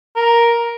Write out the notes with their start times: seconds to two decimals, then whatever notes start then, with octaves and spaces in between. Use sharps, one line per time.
0.16 A#4